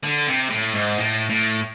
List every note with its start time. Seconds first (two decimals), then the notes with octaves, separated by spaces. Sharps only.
0.03 D3
0.27 C3
0.50 A2
0.74 G#2
0.98 A2
1.29 A2